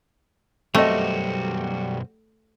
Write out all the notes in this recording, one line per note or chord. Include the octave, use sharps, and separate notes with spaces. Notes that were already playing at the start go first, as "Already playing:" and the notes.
B1 F#2 G3 A3 C4 F#4 D#5